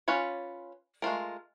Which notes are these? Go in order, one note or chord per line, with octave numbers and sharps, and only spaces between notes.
C#4 F4 B4 C#5
G#3 A3 F4 A#4